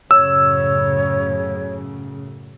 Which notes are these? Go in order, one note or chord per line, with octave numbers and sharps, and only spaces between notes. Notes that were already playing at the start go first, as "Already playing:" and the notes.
F#2 A2 C#3 C#5 E6